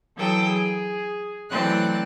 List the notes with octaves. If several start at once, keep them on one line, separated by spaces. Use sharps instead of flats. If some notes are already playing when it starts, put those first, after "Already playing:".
E3 F#3 A4 G5 D#6
G#4
E3 F#3 A3 C4 D5 F#6